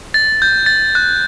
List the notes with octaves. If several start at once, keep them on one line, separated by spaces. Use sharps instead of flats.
A6
G6
A6
F#6